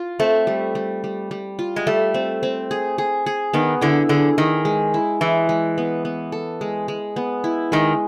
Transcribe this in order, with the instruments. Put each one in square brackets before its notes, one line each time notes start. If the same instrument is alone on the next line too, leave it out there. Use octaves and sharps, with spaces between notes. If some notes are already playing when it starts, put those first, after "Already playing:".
Already playing: [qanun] F4
[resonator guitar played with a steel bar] A3 [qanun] C4
[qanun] G3
G3
G3
G3
F4
[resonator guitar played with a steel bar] G#3
[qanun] G3 [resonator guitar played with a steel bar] A3
[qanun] C4
C4
G#4
G#4
G#4
[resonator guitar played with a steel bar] D#3 [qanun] B3
[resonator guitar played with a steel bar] D3 [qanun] E4
[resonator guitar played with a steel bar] D3 [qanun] G#4
[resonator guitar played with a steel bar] D#3 [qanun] G#4
[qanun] G#3
E4
[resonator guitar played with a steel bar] E3 [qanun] G#3
[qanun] G#3
B3
B3
A4
G#3
G#3
B3
E4
[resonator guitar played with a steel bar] D#3 [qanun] G#3